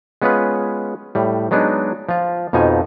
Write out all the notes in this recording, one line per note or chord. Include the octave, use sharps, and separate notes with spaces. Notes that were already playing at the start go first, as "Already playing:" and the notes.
G#3 B3 C#4 F4 G#4 B4
A2 G3
F#3 G#3 B3 D4 D#4
F3 F4
F2 B2 F3 D#4 G#5